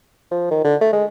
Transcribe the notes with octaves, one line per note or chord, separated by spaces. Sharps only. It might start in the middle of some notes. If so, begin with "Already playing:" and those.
F3
D#3
D3
A3
G#3